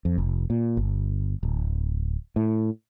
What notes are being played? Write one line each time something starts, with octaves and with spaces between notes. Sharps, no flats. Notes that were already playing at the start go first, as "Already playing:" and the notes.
F2
F1
A#2
G1
D1
A2